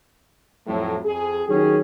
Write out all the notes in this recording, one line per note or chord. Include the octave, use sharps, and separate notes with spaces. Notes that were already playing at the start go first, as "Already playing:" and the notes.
F2 A2 F#3
F2 G#4
D#3 F#3 C#4 G4 G#4